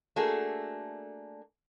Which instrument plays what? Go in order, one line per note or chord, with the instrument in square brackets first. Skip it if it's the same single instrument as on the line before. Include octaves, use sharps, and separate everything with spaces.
[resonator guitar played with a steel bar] A3 A#3 D4 F#4 G#4 A4